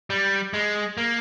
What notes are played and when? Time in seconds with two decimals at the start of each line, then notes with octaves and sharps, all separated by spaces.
0.10 G3
0.54 G#3
0.97 A#3